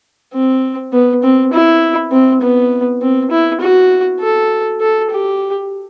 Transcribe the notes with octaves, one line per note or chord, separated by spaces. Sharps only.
C4
B3
C4
E4
C4
B3
C4
E4
F#4
A4
A4
G4